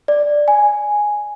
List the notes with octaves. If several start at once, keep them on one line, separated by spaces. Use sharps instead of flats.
D5
G#5